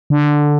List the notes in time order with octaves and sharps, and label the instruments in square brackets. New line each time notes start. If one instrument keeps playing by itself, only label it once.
[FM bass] D3